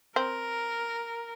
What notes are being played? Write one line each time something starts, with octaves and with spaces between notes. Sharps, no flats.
C4 A#4